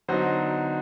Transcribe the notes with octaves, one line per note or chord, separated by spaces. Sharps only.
D3 F#3 B3 D#4 C5